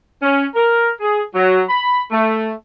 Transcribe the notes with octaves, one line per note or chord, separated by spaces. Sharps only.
C#4
A#4
G#4
F#3
B5
A3